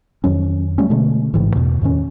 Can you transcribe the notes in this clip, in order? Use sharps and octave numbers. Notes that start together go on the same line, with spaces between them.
F2 D#3 F#3 C#4
F#3 G3 A3 C#4
B2 D3 G#3 A3
A1 G#2 C#3 E3
E2 B2
E2 A2 D#3 C#4